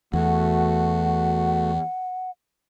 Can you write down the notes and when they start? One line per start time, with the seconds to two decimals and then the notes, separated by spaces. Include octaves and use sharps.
0.14 E2 A3 F#4 F#5